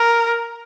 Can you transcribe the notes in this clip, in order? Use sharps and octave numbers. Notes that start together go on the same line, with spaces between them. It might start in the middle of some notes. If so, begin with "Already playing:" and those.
Already playing: A#4